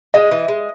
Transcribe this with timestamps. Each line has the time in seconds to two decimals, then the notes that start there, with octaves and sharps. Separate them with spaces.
0.14 G#3 D#5
0.31 E3
0.48 G#3